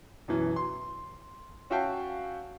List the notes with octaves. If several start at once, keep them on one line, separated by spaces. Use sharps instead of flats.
F#2 B2 E3
C6
C#4 F#4 E5 F5 G5 A5